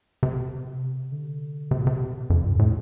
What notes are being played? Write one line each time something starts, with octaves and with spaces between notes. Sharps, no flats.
C3
D3
C3
A#2
C3
F2
G2
A2